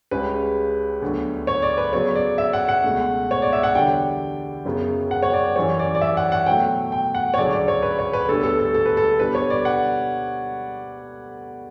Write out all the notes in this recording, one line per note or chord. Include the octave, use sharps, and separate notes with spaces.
C#2 C#3 G3 C#4 B4
D2 D3 F#3 B3
C#5
D5
B4
C#3 F#3 B3 C#5
D5
E5
F#5
F#5
C#2 B2 A3
C#5
D5
E5
F#5
E2 D3 G3 D4 G5
F#2 C#3 F#3 B3
F#5
C#5
D5
F#2 E3 G3 C#4 C#5
D5
D5
E5
F#5
F#5
B2 F#3 A3 G5
G5
F#5
C#5
D2 C#3 F#3 C#4 D5
D5
C#5
B4
C#5
B4
D2 D3 G3 B3 A4
A4
A4
A4
B4
A4
B2 G3 D4 B4
C#5
D5
F#5